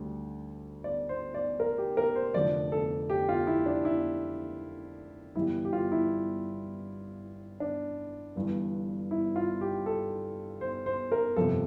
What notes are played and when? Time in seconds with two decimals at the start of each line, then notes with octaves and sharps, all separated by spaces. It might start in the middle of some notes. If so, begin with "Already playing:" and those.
Already playing: D2 D3 G3
0.84 D5
1.09 C5
1.34 D5
1.60 A#4
1.78 G4
1.97 A#4
2.16 C5
2.34 F1 F2 D3 F3 D5
2.72 A4
3.10 G4
3.29 F4
3.47 E4
3.66 D4
3.85 E4
5.35 G1 G2 E3 G3 E4
5.65 G4
5.73 F4
5.92 E4
7.60 D4
8.36 G1 G2 E3
9.11 E4
9.36 F4
9.61 G4
9.86 A4
10.61 C5
10.86 C5
11.12 A#4
11.36 G1 F2 C3 F3 A4